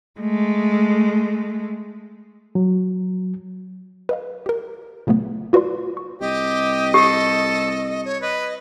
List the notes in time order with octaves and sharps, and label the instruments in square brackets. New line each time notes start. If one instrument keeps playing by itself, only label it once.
[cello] G#3 A3
[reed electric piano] F#3
[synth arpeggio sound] B4 D#5 F5
G4 A#4
A#2 C#3 F#3 A3 B3
F4 F#4 B4 D5 C6
C#6
[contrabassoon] C2 [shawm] G4 [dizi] D#5
[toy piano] G4 [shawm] A4
[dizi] C#5
[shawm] B4 [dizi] D#5